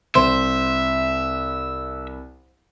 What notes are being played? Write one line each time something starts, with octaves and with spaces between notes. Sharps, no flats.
C2 C5 E5